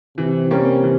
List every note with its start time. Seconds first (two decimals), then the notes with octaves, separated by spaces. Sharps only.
0.18 C3 E3
0.51 G3 A#3 C#4
0.84 E3